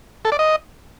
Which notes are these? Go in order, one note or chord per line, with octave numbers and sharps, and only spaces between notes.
A4
D5
D#5